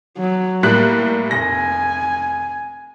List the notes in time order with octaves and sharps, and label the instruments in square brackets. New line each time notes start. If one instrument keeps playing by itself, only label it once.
[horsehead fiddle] F#3
[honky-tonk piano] A2 G3 F#6 [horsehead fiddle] A#3 A#4
[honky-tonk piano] F1 A#6 [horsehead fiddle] G#5